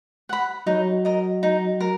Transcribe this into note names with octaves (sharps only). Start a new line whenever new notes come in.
F#5 B5
F#3 D#4
A#4 D#5
D#4
A#4